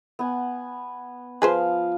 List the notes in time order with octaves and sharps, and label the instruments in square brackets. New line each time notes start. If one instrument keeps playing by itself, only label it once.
[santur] B3 F#5 G#5
[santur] F3 F5 [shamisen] G#4 B4 C5